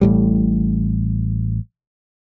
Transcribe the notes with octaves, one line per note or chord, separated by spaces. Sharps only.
A1 A2 G3